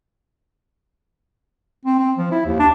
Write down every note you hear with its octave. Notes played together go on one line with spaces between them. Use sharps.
C4
C4
F3
E4
D#2
D4